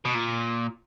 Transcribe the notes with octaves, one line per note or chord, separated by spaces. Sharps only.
B2
A#2